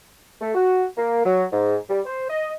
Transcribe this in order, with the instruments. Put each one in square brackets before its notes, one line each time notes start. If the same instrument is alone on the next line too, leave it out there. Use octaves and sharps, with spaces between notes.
[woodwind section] A3
F#4
A#3
F#3
G#2
G3
C5
D#5